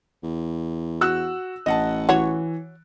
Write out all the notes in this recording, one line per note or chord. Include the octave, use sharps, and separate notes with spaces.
E2
F#4 E6 F#6
A1 D#5 F#5 A5
E3 F#4 C#5